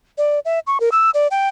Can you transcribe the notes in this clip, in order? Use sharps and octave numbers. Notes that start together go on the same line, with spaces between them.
D5
E5
C#6
A#4
E6
D5
G5